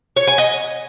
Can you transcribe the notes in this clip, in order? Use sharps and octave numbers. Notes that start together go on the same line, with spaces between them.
C#5
G#5
D#5